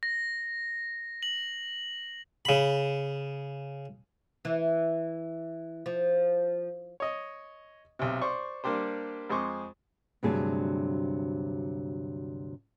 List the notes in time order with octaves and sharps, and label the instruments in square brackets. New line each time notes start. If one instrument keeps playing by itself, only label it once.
[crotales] A#6
F#7
[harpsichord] C#3 B5
[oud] E3
F3
[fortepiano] C#5 D#5
B1 C3
C5 D5 C#6
G3 A#3 D4 G4 C5
F2 G#3 C5 C#6 D6
[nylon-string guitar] D2 G2 C3 F#3 G#4 A5